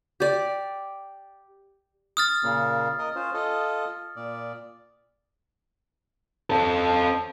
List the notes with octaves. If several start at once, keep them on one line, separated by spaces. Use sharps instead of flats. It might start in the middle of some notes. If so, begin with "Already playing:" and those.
G4 D5
D#6 F6 A6
A#2 C#3 A#3
A#4 D#5
C#4 F4 C5
F4 A4 D#5
A#2 D5
C4 A4